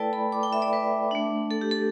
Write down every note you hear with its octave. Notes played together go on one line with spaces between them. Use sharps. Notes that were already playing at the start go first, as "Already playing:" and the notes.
Already playing: A3 E4 A4 B4 D5 G5 A5
B5
D6
G5
E5
D5
B4
A3 D4
A4
G4
A4